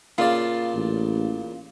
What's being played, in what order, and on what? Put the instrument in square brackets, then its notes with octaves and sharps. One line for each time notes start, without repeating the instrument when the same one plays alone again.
[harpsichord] A#2 C#3 D5 [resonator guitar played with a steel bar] F4
[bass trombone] A1